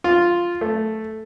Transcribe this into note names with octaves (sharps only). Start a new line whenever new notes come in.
F4
A3